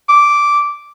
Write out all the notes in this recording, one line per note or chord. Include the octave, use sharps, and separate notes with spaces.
D6